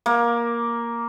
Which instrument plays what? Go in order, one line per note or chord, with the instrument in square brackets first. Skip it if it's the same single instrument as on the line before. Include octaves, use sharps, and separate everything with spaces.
[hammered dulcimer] A#3